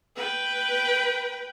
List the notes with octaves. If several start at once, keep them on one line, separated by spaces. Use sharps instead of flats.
B4 G5